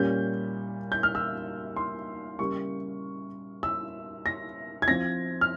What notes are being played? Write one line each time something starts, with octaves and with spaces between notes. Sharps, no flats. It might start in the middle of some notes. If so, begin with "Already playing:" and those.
Already playing: A#2 G3 C#4 G6
G6
F6
E6
C6
C#3 G3 A#3 C#6
E6
A#6
G#6
F3 C4 A#6
F6